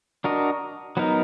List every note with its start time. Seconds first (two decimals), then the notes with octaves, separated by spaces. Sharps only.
0.24 D4 F#4 A#4 D#5
0.97 F#3 B3 D#4 A#4